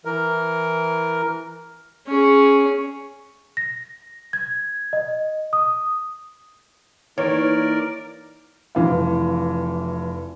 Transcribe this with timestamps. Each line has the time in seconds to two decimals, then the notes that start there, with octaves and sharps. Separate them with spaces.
0.05 E3 A#4
2.07 C#4 G#4
3.57 A#6
4.33 G#6
4.93 D#5
5.53 D#6
7.18 E3 A#3 D#4 A#4 C#5 D5
8.75 F1 E3 F5